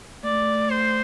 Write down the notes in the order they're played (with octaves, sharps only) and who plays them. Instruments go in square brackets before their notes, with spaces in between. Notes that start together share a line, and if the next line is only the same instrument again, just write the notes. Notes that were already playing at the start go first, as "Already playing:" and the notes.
[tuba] A3 [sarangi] D5
[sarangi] C5